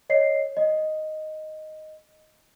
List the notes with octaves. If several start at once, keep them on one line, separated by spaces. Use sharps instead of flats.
C#5 D#5 C7
D#5